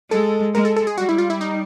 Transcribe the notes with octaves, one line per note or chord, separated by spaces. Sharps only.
G#3 A4
G#3 A#4
A4
A4
G#4
G3 F#4
E4
F4
E4
D#4